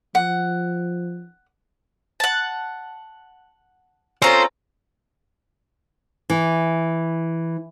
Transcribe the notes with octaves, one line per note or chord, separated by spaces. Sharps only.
F3 F#5
F#5 A5
C4 C#4 F4 A4 C5 A#5
E3